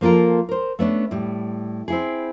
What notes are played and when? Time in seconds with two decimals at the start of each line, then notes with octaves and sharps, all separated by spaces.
0.01 F3 A#3 F4 A4 A#4
0.49 A#4 C5
0.79 A3 B3 C#4 D4
1.11 A2 G3
1.88 C4 E4 G#4